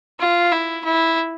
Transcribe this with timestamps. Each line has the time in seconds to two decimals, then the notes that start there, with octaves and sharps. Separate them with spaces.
0.19 F4
0.52 E4
0.84 E4